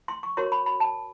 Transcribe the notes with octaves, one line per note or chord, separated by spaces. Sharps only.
C6
C#6
F#4 A#4 C#5 C6
B5
B5
A5